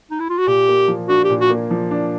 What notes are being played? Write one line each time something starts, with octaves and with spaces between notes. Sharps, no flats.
D#4
E4
F4
F#4
A#2 G4
A#3
F3
D4 F#4
G4
A#2
F#4
A#3
F3
D4